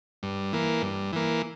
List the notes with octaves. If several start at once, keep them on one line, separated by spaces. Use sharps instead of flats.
G2
E3 A#3
G2
E3 A#3